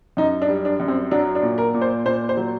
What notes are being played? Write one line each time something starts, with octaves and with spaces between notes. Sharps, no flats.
F#2 D#4
D4
G3
D4
F#2
C4
F#3 D4
D4
A#2
A#4
A#2
C5
A#2 C5
C5
F#3